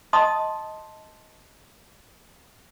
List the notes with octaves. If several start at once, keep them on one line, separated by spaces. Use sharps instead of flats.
D#5 A5 C6 D#6